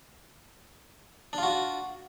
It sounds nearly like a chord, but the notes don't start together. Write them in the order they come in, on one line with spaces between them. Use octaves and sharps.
D4 F4 F#4